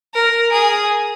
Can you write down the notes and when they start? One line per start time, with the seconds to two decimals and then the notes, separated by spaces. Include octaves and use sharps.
0.14 A#4
0.52 G#4